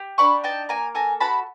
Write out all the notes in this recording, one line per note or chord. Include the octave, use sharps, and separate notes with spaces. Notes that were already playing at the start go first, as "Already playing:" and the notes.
Already playing: G4
D4 B5 C#6
D#4 G5 A5
A#3 G#5 A#5
A4 G#5 A#5
F#4 A5 B5